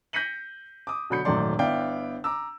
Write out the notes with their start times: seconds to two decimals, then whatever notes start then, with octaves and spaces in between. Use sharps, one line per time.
0.13 G6 A#6 B6 C#7 D#7 F#7
0.87 D6 D#6
1.10 B2 D3 F#3 B5 G6 C#7
1.25 D#1 G#1 F#2 A3 D5 C6
1.59 G1 B3 E4 D5 F5 G5
2.24 A#5 D6 E6